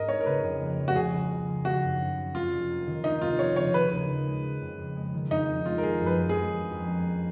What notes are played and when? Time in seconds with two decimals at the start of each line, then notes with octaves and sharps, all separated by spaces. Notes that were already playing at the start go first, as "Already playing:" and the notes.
Already playing: G#2 A#4 D#5
0.09 C#4 C#5
0.21 A#4
0.26 C#3 B4
0.43 F2
0.61 A#3
0.78 F3
0.88 F#4
0.96 C#3 G#4
1.13 C#2
1.31 C#2
1.47 F3
1.65 D#3 F#4
1.82 F#2
2.01 C#4
2.17 F#3
2.34 F2 F4
2.52 F1
2.70 A#3
2.87 D#3
3.04 D#2 D#4
3.22 F1 F4
3.39 F3 C#5
3.56 C#3 C#5
3.74 D#3 B4
3.91 D#2
4.09 D#2
4.27 G#3
4.43 C#3
4.61 F2
4.79 F2
4.96 G#3
5.13 D#3
5.31 F2 D#4
5.48 D#4
5.66 G#3 F4
5.78 A#4
5.83 F3 G#4
6.01 F#2
6.06 B4
6.18 C#4
6.29 G#4
6.35 G#3
6.52 F3
6.71 F2
6.88 C#4
7.04 A#3